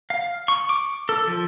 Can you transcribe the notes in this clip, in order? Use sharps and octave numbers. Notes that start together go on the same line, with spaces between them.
F5
C#6
D6
A4
F3